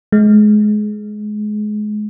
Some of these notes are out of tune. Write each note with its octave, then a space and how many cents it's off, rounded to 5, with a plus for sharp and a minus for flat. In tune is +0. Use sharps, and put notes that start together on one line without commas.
G#3 +25